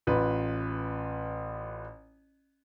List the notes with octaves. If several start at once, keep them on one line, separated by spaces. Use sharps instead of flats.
A1 F4 B4